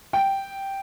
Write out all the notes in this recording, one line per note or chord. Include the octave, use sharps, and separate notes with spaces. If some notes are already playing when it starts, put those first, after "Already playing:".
G5